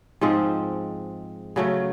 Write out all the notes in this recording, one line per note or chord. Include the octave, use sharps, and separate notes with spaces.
G#2 F3 G#3 C4
C#3 F#3 A3